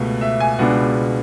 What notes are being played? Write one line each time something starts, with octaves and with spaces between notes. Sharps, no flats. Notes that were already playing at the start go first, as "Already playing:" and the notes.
Already playing: C#2 B2 A3
E5
G#5
C#2 B2 G#3 D4 F#5